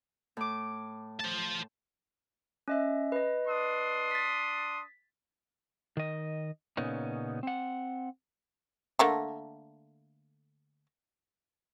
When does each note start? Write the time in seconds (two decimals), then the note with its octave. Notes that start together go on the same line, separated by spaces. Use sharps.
0.37 A2 D6
1.20 C5 A5
2.68 C#4 D#5 E5
3.12 B4 D#5
3.47 D4 C6 D#6
4.11 A6 B6
5.97 D#3 D#5
6.77 A#2 C#3 B3 C#4 D#4
7.43 C4 F#5
8.99 D3 A3 A#3